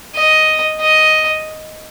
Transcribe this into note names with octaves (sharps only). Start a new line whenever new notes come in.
D#5
D#5